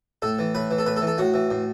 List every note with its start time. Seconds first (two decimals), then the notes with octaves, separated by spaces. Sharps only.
0.22 A2 A4
0.39 E3
0.55 A2 B4
0.71 E3
0.78 A4
0.86 A2 B4
0.97 A4
1.02 E3
1.07 A4
1.18 A2 F#4
1.34 E3
1.51 A2